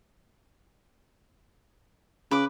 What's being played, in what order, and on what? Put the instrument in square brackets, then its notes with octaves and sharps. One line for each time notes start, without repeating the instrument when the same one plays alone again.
[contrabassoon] C#3 [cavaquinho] B4 D6